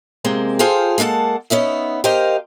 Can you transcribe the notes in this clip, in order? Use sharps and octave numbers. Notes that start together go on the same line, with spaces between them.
C3 G#3 A#3 C4
F4 G#4 A4 C5 F5 G5
G#3 A#3 A4 F#5 A5
B3 C#4 D#4 E5
G4 A#4 C5 D#5 F5